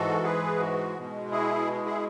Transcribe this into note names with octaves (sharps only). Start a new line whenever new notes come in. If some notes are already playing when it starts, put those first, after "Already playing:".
Already playing: G#2 E3 G#3 F#4 A4
G#4 B4
F#4
B2 G#3
E4 G#4
E4 G#4